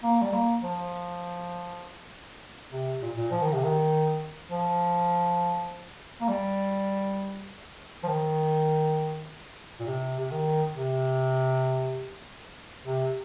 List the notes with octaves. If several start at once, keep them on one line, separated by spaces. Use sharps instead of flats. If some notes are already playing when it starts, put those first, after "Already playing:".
A#3
G3
A#3
F3
C3
A#2
A#2
F3
D#3
C3
D#3
F3
A#3
G3
F3
D#3
A#2
C3
C3
D#3
C3
C3